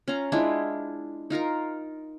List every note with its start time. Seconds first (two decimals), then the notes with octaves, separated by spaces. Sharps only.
0.08 C#4 F4 A#5
0.32 G#3 D4 E4 F4
1.30 D#4 F4 A#4 A#5